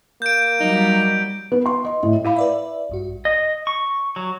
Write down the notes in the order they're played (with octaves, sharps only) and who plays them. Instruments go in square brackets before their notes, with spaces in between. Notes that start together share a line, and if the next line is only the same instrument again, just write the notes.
[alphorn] A#3 [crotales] G6 D7
[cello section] F#3 G3 [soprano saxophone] D#4
[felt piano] B3
C6
D#5
A2
[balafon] E4 F5 B5
[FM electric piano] B4 D5 E5
A#1 G2 F#4
[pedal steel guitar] D#5
C#6
F#3